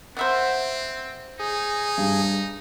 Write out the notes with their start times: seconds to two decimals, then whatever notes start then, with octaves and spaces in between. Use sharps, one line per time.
0.17 C4 C5 E5 F#5
1.39 D#4 G#4
1.98 G2